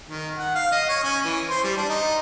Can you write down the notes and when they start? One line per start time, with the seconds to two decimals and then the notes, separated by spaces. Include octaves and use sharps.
0.08 D#3
0.37 F#5
0.55 F5
0.72 D#5
0.89 C#5
1.04 C#4
1.25 E3
1.50 C5
1.64 G3
1.77 D4
1.89 D#4